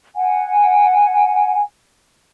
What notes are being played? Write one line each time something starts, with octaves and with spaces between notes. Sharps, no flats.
F#5 G#5